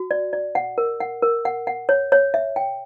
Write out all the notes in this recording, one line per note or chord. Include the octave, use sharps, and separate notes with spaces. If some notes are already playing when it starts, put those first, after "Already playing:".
Already playing: F#4
D5
D5
F#5
A#4
F#5
A#4
F#5
F#5
C#5
C#5
E5
G5